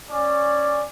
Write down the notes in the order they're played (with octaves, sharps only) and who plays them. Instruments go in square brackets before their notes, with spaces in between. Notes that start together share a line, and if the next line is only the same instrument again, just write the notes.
[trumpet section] C#4 D5